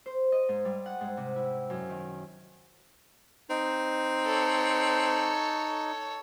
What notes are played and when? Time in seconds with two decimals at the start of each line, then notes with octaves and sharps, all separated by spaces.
0.06 C5
0.32 D#5
0.49 G#2
0.65 G3
0.86 F#5
1.01 G#2
1.17 C3
1.36 E4
1.70 F#2
1.89 D#3
3.50 C4 D#4
4.25 A4 C#5